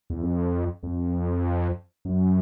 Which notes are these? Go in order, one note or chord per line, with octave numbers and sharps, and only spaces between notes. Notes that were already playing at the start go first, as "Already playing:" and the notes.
E2
F2
F2
F#2